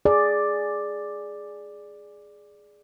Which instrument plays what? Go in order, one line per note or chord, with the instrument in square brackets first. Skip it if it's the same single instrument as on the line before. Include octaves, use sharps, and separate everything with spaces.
[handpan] G#4 D5